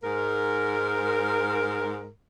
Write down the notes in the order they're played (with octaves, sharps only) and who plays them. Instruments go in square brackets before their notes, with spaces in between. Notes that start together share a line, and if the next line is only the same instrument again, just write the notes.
[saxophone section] G#2 A#4